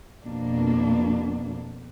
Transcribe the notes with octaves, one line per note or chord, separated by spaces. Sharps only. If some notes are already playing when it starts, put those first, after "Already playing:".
F2 B2 A#3 D4